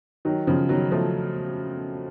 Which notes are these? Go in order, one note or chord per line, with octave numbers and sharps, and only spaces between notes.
D#3 F#3
C#3 F3
D#3 F#3
F3 A3